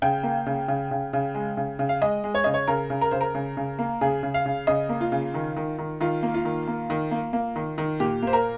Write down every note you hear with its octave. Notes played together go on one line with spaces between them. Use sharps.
C#3 G5
A#3
C#3
C#3
C#3
C#3
G#3
C#3
C#3
F5
G#3 D#5
G#3
C#5
C#3 D#5
C#5
C#3 A#4
C#3
A#4
C#3 C5
A#4
C#3
C#3
A#3
C#3 G#4
C#3
F5
C#3
C#3 D#5
A#3
F4
C#3
D#3
D#3
D#3
D#3 F4
A#3
F4
D#3
A#3
D#3
A#3
A#3
D#3
D#3
A#2 G4
A#3 C5
A#4